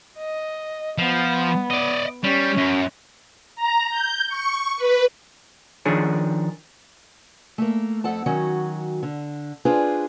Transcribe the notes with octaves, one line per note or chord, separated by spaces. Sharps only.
D#5
F3 B3
D5 D#5
G3 C#4
F#2
A#5
G6
C#6
B4
D#3 F3 D4 G#4 C#5
A3 A#3
F2 A4 F#5 A5
D#3 F#3 C#4 F#4
D3
D4 F4 G#4 B4 C5